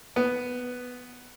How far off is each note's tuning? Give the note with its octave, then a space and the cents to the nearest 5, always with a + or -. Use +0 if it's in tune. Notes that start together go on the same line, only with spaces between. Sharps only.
B3 +5